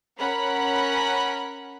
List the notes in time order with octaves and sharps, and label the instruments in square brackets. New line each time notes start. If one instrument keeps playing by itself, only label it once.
[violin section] C#4 A#4 F#5 B5